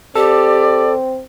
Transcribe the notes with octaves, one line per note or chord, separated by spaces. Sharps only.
C4 G4 A4 D5